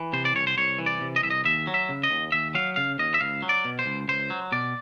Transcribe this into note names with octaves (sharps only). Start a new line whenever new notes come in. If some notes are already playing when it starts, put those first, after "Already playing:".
Already playing: E3
C3 C5
D5
C2 C#5
C5
C2 C#5
E3
D5
C3
D#5
C2 E5
D#5
D#2 E5
F#3
E5
C#3
D#5
D#2
D#2 E5
F#3 F5
C#3 F5
D#2 D#5
E5
C#2 F5
F#3
D5
B2
C5
C#2
C#2 C5
F#3
B2 D5